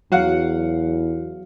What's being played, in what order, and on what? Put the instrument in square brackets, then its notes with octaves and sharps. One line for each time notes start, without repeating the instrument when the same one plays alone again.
[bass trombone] E2 [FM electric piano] F#3 [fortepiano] F5 F#5